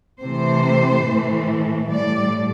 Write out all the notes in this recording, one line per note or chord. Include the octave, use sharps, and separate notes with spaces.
C3 E3 A3 C5
A2 E3 A3
A2 G3 D5